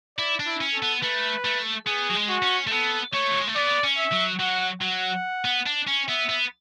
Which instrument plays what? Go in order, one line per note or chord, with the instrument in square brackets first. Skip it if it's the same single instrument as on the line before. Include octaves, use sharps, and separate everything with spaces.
[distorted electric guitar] E4 [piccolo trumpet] D5
[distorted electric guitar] D4
[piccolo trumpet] E4
[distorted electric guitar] C#4
[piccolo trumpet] A4
[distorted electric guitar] B3
[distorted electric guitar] A3 [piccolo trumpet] B4
[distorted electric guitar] A3
[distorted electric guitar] B3 [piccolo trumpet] G#4
[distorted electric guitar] F#3
G#3
[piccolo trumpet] F#4
[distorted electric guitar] C#4
A3
[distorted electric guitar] B3 [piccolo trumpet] A4
[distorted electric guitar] A3 [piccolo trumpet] C#5
[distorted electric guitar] F#3
G#3
A3
[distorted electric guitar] B3 [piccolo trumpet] D5
[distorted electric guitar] C#4
[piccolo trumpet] E5
[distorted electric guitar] F#3
[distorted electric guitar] F#3 [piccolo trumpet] F#5
[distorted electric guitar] F#3 [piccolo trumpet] F#5
[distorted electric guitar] B3
D4
C#4
[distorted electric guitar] B3 [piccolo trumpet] E5
[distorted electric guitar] B3